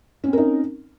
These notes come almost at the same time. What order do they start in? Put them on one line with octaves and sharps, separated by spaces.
C#4 C4 A#4 D#4